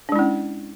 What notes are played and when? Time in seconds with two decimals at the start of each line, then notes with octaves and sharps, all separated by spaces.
0.09 D4
0.12 G#3
0.16 E4
0.19 C#4